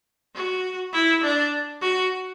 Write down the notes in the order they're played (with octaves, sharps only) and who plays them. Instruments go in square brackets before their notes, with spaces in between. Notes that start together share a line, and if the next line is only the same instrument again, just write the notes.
[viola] F#4
E4
D4
F#4